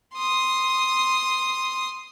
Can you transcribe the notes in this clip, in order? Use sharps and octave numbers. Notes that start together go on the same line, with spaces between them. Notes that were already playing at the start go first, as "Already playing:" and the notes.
C6 D#6